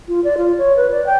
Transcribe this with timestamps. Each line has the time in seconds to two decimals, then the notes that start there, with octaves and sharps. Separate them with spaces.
0.08 F4
0.24 D5
0.37 F4
0.58 C#5
0.77 B4
0.91 D5
1.06 G5